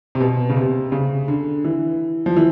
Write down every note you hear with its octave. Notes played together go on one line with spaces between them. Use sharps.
C3
B2
C#3
C3
C#3
D3
E3
F3
E3